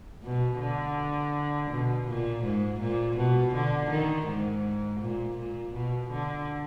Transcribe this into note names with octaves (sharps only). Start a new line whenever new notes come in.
B2
D3
B2
A#2
G#2
A#2
B2
D3
D#3
G#2
A#2
A#2
B2
D3